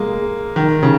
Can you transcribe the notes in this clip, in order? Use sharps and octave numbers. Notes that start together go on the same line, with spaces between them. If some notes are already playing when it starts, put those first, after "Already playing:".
Already playing: G#3 A#3
D#3
C#3